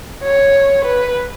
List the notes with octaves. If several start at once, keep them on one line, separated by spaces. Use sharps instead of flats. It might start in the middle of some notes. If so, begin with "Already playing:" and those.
C#5
B4